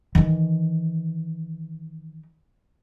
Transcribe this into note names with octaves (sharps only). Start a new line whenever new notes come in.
D#3 E3